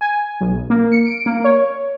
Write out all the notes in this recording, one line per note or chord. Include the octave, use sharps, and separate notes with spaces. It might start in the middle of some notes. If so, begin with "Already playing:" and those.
G#5
B1
A#3
C#7
D7
A#3
C#5